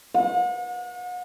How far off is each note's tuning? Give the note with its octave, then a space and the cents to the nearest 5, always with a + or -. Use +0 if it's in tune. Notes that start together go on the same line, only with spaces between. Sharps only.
F#5 -40